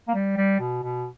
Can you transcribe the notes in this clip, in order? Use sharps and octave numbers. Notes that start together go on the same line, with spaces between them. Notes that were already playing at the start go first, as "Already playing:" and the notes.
A#3
G3
G3
B2
B2